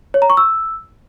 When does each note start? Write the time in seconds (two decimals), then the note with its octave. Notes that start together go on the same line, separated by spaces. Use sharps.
0.14 C#5
0.22 A#5
0.30 C#6
0.37 E6